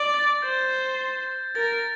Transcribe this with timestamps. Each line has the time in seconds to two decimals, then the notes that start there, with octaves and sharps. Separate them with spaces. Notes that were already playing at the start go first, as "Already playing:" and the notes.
Already playing: D5
0.14 A6
0.42 C5 G6
1.55 A#4 A6